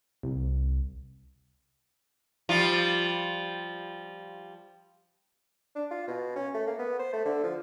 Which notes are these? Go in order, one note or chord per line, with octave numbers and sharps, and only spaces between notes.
C2
F3 G3 F4
D4
F4
B2
C#4
A3
A#3
B3
C5
A3
D3
F3